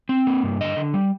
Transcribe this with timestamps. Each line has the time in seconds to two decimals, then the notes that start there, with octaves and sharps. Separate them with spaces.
0.09 C4
0.27 A#3
0.43 G2
0.61 D3 D#5
0.77 D3
0.94 G3